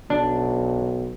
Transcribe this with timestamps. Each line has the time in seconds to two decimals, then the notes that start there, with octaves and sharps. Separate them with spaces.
0.10 B1 D4